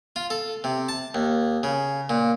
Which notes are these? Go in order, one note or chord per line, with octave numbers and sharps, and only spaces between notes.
F4
A4
C3
A5
D#2
C#3
A#2